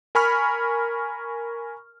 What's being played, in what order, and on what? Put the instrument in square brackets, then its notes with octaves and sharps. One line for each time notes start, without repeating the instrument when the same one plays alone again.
[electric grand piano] A#4 G#5 B5 C#6 F6